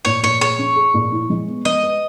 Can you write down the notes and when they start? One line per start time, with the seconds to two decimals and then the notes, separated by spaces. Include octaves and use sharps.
0.05 A#2 C#5
0.23 A#2 C#5
0.41 G#4 C#5
0.59 C#4
0.76 G#4
0.94 A#2
1.12 E4
1.30 G#3
1.48 B3
1.65 G#3 D#5
1.83 B4